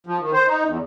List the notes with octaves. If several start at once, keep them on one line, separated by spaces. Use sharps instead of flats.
F3
D#3
C5
D#4
E2